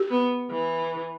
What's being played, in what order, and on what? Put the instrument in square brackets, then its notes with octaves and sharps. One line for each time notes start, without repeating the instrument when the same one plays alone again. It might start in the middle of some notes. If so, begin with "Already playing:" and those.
Already playing: [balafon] G4
[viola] B3
E3